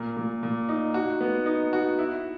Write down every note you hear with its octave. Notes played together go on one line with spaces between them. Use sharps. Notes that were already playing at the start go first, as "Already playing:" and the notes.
Already playing: A#2 A#4
A#2
A#2
D#4
F#4
B3
D#4
F#4
E4